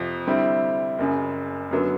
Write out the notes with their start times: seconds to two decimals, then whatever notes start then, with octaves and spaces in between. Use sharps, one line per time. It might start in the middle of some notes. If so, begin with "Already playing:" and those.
Already playing: F2 C3 F3
0.27 D3 G3 C4 E4
0.99 F#1 F#2 C#3
1.71 F#2 D3 F#3 B3